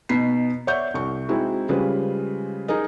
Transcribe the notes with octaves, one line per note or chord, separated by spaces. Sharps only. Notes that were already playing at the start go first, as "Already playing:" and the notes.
B2 B3 D#4 B6 C7
C#5 D5 E5 F#5 C#6 G6
C2 C#6
G#3 C4 D#4 E4 F#4
C#3 G3 G#3 F4 B4 C5
D#4 G#4 A#4 D#5